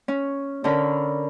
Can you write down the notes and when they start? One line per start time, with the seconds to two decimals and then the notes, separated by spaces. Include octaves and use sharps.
0.08 C#4
0.64 D3 C#4 A#4 B5